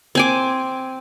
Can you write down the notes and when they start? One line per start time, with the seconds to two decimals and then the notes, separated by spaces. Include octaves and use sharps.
0.15 C4 G#5 D6